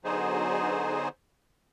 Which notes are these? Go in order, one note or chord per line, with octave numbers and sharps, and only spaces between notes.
D3 F#3 B3 D#4 G#4 C5